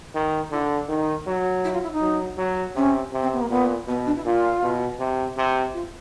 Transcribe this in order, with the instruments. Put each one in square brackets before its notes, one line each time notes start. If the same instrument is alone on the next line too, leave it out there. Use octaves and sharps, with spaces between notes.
[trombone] D#3
[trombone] D3 [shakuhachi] E4
[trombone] D#3 [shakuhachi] D#4
[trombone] F#3
[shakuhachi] E4
F4
E4
D#4
[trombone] F#3
F#3
[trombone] C3 [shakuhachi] C#4
[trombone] C3
[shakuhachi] C4
B3
A#3
[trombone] A#2 [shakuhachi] B3
[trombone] B2 [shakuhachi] B3
[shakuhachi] D4
E4
[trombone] A#2 [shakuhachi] F4
[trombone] B2
C3
C3
[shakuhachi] F4